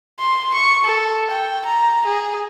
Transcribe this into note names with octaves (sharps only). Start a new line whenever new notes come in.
C6
C#6
A4
G5
A#5
G#4